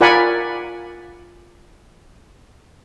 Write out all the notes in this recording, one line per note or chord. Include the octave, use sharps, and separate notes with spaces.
F4 A#4 D5 F#5 G#5 B5